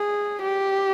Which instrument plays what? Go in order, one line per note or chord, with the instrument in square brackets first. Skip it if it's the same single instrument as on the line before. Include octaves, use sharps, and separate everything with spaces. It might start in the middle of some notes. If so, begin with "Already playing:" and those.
Already playing: [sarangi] G#4
G4